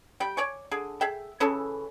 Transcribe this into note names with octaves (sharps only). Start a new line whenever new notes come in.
G3 G5
C#5 D5 G#5 C#6
D3 G#4
G#4 E5 G5
C#3 E3 C#4 A4